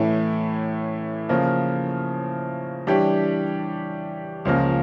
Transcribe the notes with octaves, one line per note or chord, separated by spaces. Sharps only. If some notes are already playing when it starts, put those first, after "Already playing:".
Already playing: A2 E3 A3 C#4 E4
C#3 F3 A#3
E3 G3 D4 G4 C#5
C#2 C#3 F3 A#3